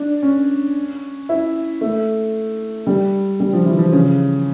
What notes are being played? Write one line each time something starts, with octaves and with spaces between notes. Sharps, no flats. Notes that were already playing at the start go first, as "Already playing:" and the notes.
Already playing: D4
C#4
E4
A3
G3
G3
F3
E3
F3
C#3